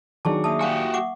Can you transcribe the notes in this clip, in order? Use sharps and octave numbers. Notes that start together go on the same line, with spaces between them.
D#3 F#3 D4 G#4 A5 C#6 D6
A#3 E5 A5 D#6
F#4 G4 F5 G#5
F#5 C#6 D6